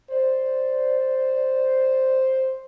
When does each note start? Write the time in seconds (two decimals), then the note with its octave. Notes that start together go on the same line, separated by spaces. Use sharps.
0.11 C5 D5